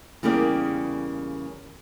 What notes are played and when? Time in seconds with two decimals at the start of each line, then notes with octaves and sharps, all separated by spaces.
0.23 E2 C#3 G3 A#3 G#4 D5